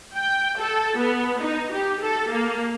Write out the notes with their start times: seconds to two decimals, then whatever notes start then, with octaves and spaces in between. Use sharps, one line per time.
0.15 G5
0.58 A4
0.98 B3
1.41 D#4
1.72 G4
2.02 A4
2.31 A#3